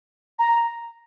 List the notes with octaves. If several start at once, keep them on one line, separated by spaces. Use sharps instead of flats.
A#5